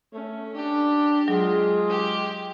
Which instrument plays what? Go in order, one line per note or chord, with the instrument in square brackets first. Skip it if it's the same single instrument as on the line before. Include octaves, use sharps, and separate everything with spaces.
[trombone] A3 [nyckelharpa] C#4
[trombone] D4 [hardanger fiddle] G4
[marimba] F#3 [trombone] G#3 [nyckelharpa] F4 G#4
[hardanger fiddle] G4